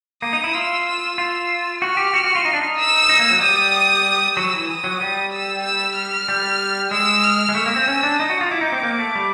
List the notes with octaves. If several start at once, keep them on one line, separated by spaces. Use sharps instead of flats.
A#3 D#6
D#4
E4
F4 E6
E6
F4 E6
F#4 F6
G4
F#4
F#4
F4
D#4
D4
D#4
E6
D#4
A#3
F#3
G3 D#6
F#3 E6
E3
D#6
F#3
G3
E6
E6
F6
G3
G#3 E6
F6
G#3
A3 E6
A#3
C4
C#4
D4
D#4 D#6
F#4
F4
E4 D6
D#4
C4
A#3
A3
G3